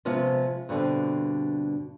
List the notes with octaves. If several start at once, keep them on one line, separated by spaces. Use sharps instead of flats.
C3 F3 G#3 B3 C#4
G2 B2 D3 C4